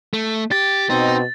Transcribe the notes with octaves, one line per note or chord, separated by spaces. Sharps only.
A3
G4 A6
B2 C4 D#4